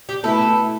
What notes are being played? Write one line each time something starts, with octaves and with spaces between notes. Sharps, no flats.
G4
B2 A3 E4 A4 B4